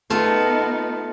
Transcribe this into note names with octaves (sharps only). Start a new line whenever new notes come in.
A3 B3 D#4 F4